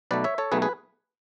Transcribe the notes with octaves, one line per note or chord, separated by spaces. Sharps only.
B1 B2 A3 B4 D5
C#5 E5
A4 C#5
B1 B2 A3 G#4 B4
G#4 B4